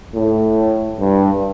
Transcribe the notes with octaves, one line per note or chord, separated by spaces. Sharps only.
A2
G2